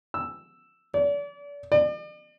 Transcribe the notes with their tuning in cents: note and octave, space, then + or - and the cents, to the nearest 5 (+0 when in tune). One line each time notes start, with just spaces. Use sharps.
E6 +5
D5 -35
D5 +45